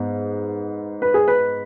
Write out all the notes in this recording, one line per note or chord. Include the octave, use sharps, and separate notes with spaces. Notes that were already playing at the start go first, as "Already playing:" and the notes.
Already playing: G#2 B3
B4
G#4
B4